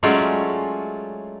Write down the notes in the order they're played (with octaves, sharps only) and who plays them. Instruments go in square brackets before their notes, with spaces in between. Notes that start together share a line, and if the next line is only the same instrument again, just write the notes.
[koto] F#3 G#3 A3 C#4 F4 D5